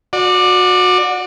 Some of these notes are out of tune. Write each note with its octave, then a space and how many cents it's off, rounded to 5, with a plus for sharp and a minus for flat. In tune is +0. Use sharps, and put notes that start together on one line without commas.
F#4 -25 D5 +15